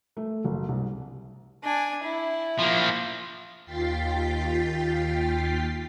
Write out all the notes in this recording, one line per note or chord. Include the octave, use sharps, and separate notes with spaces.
A3
F#1
C2
D4 G#5
E4
F3 A#3
D#2 F4 G5 A6 B6 C7